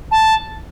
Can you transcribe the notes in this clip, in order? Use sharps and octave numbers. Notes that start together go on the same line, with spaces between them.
A5